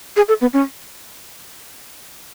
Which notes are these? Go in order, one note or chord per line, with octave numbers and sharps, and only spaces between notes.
G#4
A4
B3
C#4